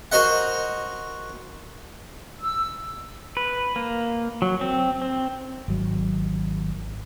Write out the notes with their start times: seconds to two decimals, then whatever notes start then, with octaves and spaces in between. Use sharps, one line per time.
0.12 F#4 A#4 C5 D#5 F#5
2.39 E6
3.37 B4
3.76 A#3
4.42 F#3
4.61 C4
5.02 C4
5.68 G#1 F#3